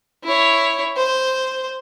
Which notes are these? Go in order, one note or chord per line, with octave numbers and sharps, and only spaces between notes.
E4 C#5
C5